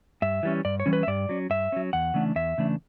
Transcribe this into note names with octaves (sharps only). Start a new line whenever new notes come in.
G2 E5
E3 G3 C#4
G2 D5
C#5
E3 G3 C#4
B4
E5
G2 D5
F#3 C#4
G2 E5
F#3 C#4
E2 F#5
C#3 E3 A3 D4
E2 E5
C#3 E3 A3 D4